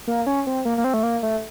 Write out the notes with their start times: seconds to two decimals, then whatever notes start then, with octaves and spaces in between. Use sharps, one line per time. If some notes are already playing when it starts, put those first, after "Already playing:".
0.07 A#3
0.26 C#4
0.47 C4
0.65 A#3
0.78 A#3
0.84 C4
0.94 A3
1.03 A#3
1.23 A3